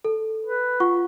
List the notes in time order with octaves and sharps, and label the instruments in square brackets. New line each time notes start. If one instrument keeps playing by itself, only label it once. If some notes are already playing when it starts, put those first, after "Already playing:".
[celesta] A4
[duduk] B4
[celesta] F4 F#5 C#6